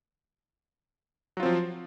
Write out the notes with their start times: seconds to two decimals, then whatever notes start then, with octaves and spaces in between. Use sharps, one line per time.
1.37 F#3
1.40 F4
1.43 C4
1.46 F3